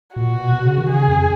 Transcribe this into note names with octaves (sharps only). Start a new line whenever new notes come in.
A#2 F#4
B2
B2
C#3
D#3
C#3 G#4
F2